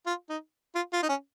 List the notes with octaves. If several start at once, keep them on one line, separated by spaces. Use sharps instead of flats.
F4
D#4
F4
F4
D#4
C#4